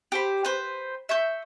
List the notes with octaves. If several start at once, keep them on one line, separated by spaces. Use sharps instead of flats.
G4 C5 B5
B4 C5
E5 C#6 G6